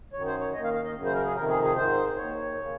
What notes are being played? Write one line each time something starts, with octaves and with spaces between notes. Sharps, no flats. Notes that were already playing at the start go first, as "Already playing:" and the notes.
F#2 D#3 C#5
C5
C#5
D#2 D#3 D#5
F5
F5
D#5
F#2 C#3
C5
A#4
G#4
F2 C3 D#3 A#4
G#4
G#4
G#2 D#3 C5
D#2 D#3 C#5
C#3